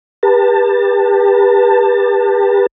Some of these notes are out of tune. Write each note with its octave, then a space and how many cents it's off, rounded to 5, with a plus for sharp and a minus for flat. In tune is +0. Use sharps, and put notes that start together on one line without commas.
G4 +30 B4 -30 A5 +20